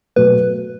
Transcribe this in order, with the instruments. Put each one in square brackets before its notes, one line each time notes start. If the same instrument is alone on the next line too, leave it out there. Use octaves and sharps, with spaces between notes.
[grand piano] B2 F#3 A3 [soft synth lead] B4